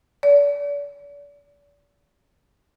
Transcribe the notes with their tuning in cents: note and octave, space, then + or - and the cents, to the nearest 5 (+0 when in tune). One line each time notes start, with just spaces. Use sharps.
D5 -40